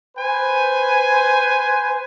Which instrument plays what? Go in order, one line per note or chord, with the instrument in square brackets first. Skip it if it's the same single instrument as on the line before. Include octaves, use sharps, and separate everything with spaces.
[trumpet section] B4 C5 G#5